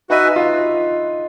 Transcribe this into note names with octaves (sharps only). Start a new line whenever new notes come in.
D#4 F#4 B4 E5 G#5
F4